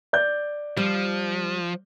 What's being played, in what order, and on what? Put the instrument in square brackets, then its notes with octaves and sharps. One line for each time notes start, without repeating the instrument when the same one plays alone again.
[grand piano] D5 G6
[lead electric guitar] F3 [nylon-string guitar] G3